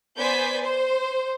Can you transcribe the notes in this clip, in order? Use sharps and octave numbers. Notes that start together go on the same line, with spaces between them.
B3 C5 D5 G#5 G6 B6
C5